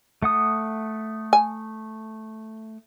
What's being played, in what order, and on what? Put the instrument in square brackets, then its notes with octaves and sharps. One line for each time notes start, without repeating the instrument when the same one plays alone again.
[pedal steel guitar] A3 F#5 D#6
[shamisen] G#5